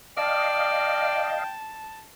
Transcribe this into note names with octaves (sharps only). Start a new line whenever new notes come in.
D5 D#5 F5 G5 A5